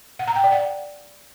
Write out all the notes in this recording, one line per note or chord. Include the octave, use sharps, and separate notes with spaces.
F#5
A#5
G5
D5
F#5